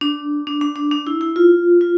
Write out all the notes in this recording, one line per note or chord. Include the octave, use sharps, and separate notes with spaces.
D4
D4
D4
D4
D4
E4
E4
F4
F4